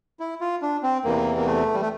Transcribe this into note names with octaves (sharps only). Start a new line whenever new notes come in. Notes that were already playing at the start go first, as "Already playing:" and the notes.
E4
F4
D4
C4
E2 C3 E3 A#3
A#3
A3
G3
A3